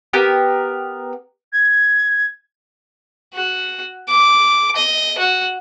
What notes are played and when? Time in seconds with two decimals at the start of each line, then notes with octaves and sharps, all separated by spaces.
0.13 B3 G4 A#4
1.52 G#6
3.34 F#4
4.08 D6
4.76 D#5
5.19 F#4